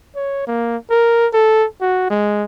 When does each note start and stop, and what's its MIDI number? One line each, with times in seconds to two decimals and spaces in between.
0.15 0.46 73
0.47 0.76 58
0.90 1.27 70
1.33 1.65 69
1.81 2.07 66
2.10 2.45 56